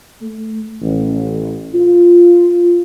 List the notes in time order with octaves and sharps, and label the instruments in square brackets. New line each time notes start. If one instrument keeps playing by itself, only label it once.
[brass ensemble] A3
A1
F4